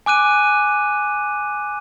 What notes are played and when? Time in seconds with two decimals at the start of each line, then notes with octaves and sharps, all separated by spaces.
0.06 G#5 D6 F#6 D#7